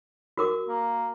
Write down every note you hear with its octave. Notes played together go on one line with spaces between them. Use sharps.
F#4 A#4 D6
A#3